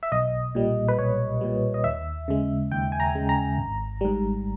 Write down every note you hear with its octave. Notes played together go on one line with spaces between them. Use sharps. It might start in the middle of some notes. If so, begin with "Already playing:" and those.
E5
B1 D#5
A#2 G3
B4
B1 C#5
A#2 G3
D#5
D#2 E5
C#3 G#3
D#2 G5
G#5
A#5
C#3 G#3
A#5
G#1
G#2 G3